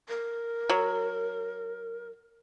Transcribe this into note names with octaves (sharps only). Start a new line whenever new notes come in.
A#4
F#3